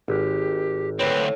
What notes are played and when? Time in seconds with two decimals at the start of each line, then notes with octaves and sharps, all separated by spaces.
0.08 G#1 G4
0.99 D2 C4 A4 B4 C#5